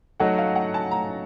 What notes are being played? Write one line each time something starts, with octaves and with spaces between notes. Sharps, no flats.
F#3 A3 D#4 F#4 F#5
F5
F#5
A5
A#5